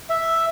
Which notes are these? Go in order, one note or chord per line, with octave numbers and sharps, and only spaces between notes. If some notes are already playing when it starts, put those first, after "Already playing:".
E5